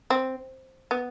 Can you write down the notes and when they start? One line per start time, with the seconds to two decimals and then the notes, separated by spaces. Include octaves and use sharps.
0.10 C4
0.91 B3